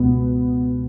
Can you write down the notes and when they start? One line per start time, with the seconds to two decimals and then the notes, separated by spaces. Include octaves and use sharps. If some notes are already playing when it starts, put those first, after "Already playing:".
Already playing: C#2 B2 B3